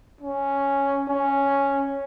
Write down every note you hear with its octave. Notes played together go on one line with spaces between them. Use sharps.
C#4
C#4